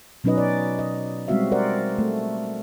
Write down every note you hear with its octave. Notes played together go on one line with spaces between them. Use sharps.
B2 F#3 C#4 D#4 B4 D#5
D5
D#5
G3 G#3 C4 F#4 E5 F5
A#4 C5 D5 F#5
A3